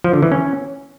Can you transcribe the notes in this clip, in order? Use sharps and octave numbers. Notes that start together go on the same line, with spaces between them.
F3
D3
E3
C#4